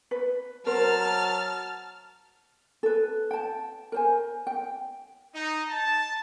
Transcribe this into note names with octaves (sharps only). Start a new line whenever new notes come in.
B4
F#3 A#4 C5 A5 F6
A4 B4
G5 A5
A#4 C5 G#5
G5
D#4
A5